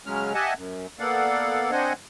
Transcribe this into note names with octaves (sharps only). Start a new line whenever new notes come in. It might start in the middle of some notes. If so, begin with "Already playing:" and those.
C#3 F#3 G#3 C#4 F6
G4 D#5 E5 F#5 G#5 A5
F#2
A#3 B3 A4 D5 F5 F#5
C4 D4 C5 D#5 F#5 G#5